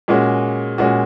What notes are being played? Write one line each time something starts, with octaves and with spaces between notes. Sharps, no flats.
A#2 G#3 C#4 F#4
A#2 G#3 C#4 F#4